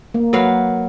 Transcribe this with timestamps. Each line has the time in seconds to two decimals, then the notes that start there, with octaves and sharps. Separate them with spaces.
0.14 A#3
0.33 F#3 B4 F5